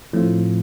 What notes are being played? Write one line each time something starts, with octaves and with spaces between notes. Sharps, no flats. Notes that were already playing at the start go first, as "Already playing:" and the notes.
A2 F3 A3 C4 F4